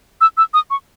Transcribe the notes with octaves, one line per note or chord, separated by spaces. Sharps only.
E6
E6
D#6
C#6